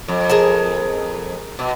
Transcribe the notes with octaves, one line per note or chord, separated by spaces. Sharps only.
F2
G#4 A#4 A5
B2